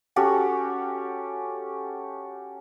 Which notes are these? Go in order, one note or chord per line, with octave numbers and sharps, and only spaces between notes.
C#4 F#4 G4 A4